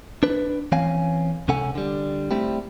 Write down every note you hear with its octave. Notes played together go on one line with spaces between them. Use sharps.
D4 B4
E3 C4 C#4 F5 G#5
C#2 C3 C#4 A4 F#5 G#5
D3 G3
G3 A3 C4 E4 G4